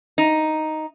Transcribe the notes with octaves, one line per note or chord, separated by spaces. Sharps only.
D#4